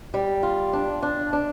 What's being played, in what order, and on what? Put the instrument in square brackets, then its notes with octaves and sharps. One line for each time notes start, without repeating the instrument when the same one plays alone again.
[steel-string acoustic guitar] G3
F4
D4
D4
D4